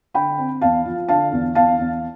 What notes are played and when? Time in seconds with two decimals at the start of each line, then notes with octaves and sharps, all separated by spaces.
0.14 D3 G5 B5
0.38 C4
0.61 E2 F5 A5
0.85 F3
1.09 D3 F5 A5
1.32 E2
1.55 E2 F5 A5
1.79 E2